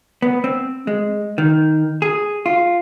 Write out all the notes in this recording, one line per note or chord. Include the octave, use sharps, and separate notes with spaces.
B3
C4
G#3
D#3
G#4
F4